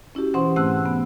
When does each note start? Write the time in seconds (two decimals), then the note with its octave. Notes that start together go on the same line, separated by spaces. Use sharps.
0.15 C#4 E4 F#4 G4
0.34 B2 E3 C#4 C5 F#5 C6
0.56 G#2 A3 C4 F#5 E6 F#6
0.86 B3